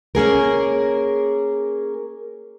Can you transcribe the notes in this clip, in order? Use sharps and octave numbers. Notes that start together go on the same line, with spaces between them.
A#3 C#4 G#4 A#4